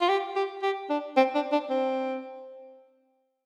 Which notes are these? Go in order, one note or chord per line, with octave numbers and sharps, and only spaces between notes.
F4
G4
G4
G4
D4
C4
D4
D4
C4